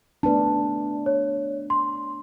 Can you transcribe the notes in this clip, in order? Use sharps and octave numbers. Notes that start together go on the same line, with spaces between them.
A3 B3 D4 B4 A5
C#5
C6